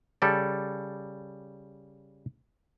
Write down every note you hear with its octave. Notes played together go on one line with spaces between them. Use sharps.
C#3 G3 A4 D5